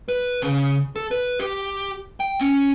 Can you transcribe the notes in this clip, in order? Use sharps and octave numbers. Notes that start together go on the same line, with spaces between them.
B4
C#3
A4
B4
G4
G5
C#4